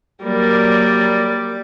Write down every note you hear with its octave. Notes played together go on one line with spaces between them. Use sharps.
F#3 G3 A#3 A#4 D5